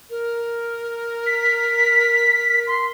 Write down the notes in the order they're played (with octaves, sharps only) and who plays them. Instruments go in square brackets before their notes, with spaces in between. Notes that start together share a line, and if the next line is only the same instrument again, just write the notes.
[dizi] A#4
[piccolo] B6
C6